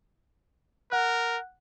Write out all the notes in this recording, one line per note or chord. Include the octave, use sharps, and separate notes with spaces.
A#4 F#5 F#6